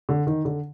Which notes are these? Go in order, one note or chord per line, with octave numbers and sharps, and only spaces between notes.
D3
D#3
D3